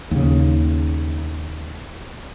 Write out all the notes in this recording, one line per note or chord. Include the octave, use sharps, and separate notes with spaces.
D#2 C#3